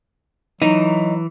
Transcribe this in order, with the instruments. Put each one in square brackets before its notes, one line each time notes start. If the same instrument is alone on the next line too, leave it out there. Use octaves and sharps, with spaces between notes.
[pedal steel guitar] E3 [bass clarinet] F#3 [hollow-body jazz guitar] D#4